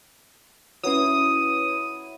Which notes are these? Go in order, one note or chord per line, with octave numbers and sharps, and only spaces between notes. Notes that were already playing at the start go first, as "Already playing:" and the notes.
F#3 C#4 E4 B4 C#5 D#6